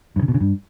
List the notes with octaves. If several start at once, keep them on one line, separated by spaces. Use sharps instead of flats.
G2
C#3
B2
C#3
G2